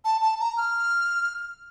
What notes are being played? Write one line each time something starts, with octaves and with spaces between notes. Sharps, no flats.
A5
A5
A#5
F6